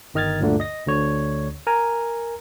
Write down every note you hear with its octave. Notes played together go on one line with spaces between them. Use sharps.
G1 D#3 D#5 F6 G#6 A6
D2 G2 A#2 D3 A3
D#5 A#6
D2 D3 C#5
A#4 G#5 A#5